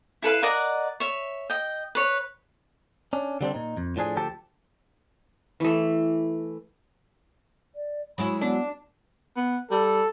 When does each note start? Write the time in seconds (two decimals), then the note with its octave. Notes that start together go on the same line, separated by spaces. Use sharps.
0.22 E4 A4 B4 F5
0.43 A#4 D5 D#5 F#5
1.00 C#5 E5
1.50 D#5 G5
1.95 B4 C#5
3.13 C#4 D4
3.41 D3 G3 C4 D4
3.54 A#2 D#4
3.77 F2
3.96 A2 F3 D4 G#4
4.16 D2 F3 G4 A4 A5
5.60 E3 A3
7.75 D5
8.18 F#3 G#3 E4 B5
8.41 B3 D4
9.37 B3
9.71 G3 A4